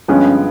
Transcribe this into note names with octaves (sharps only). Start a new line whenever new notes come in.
G2 D3 F3 G#3 B3 C#4